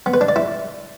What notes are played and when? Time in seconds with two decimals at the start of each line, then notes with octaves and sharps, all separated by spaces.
0.06 B3
0.14 B4
0.21 D4
0.29 D5
0.36 E4